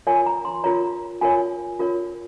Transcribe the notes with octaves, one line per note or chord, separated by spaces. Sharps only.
F4 A#4 C#5 G#5
A#5
C6
F4 A#4 C#5 A#5
F4 A#4 C#5 G#5
F4 A#4 C#5